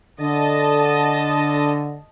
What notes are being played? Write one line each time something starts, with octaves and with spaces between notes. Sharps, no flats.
D3 D#5 A5